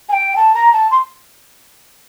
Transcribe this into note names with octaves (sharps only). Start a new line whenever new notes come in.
G#5
G5
A5
A#5
A5
C6